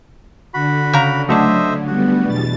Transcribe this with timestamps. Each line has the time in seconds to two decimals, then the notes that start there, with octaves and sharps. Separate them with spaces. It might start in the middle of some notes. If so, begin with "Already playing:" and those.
0.54 D3 F#4 B5
0.93 C#3 A#5
1.29 F#3 A3 D4 C5 D#5 E5
1.87 G3 B3 F#4
2.24 E2 B2 A6